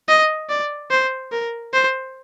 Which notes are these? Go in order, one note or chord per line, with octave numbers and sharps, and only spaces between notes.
D#5
D5
C5
A#4
C5